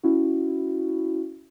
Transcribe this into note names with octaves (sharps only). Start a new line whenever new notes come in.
C#4 E4 F#4